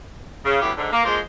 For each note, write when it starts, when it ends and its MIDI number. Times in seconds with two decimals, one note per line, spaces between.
0.45 0.58 49
0.62 0.71 38
0.62 0.71 45
0.62 0.71 59
0.62 0.71 64
0.62 0.71 67
0.76 0.92 44
0.76 0.92 50
0.92 1.05 58
1.05 1.18 53
1.05 1.18 56
1.05 1.18 58
1.05 1.18 72